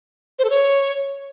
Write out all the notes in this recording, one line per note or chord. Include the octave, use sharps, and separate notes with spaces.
C5
A4
C#5